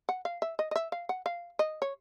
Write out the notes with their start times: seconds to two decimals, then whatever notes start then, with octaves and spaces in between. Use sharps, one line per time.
0.09 F#5
0.25 F5
0.42 E5
0.59 D#5
0.71 D#5
0.76 E5
0.92 F5
1.09 F#5
1.26 F5
1.59 D#5
1.82 C#5